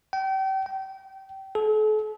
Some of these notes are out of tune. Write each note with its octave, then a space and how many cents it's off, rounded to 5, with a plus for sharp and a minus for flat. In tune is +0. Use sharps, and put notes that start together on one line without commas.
G5 -35
G5 -25
A4 -40